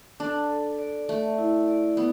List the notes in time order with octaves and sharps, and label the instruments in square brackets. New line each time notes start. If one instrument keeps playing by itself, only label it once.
[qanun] D4 [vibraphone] A4
[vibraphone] A4
D5
[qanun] A3 [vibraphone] D5
[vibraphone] E4
D5
[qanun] B3